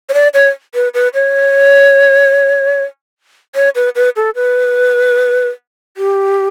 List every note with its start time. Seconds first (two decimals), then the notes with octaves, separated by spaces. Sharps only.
0.09 C#5
0.14 D5
0.34 C#5
0.75 B4
0.94 B4
1.14 C#5
3.55 C#5
3.75 B4
3.95 B4
4.16 A4
4.35 B4
5.97 G4